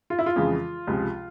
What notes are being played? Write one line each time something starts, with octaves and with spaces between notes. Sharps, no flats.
F4
E4
F4
F2 C#3 E3 G#3
C#2 C3 F3 G#3